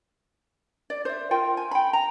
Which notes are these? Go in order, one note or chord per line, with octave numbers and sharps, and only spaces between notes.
D5
C5 E5
F4 A#4 G5
G#5
G5 B5
A#5